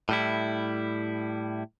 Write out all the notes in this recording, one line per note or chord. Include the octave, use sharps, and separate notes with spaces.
A2 G3 E4